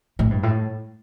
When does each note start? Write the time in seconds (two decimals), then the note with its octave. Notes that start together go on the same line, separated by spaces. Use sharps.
0.19 A2
0.31 G2
0.43 A2